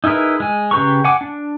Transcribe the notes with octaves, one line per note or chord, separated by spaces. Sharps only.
D#4 E4 G#4 A#4 B4
G#3 G#5
C#3 G4 B4 A#5 C#6
F#5 G#5 D6
D4